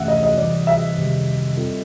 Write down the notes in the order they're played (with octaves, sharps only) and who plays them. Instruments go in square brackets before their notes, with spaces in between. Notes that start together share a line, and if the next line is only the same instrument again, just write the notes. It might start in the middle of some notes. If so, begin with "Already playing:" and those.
Already playing: [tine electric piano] F2 C3 E3 A3 C#4 [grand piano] E5 F#5
[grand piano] D#5
D#5
[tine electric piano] C3 E3 G3 [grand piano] D5
[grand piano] E5
[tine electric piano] F2 C3 D#3 G3
G3 C4 F4 A4